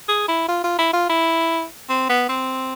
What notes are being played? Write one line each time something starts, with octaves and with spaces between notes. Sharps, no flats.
G#4
E4
F4
F4
E4
F4
E4
C4
B3
C4